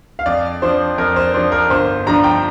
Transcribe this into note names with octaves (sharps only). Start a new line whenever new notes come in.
F5
F2 D5
F3 D4 C5
F2 A#4
C5
F3 D4 C5
A#4
G1 C5
G2 F3 D4 A#5
G5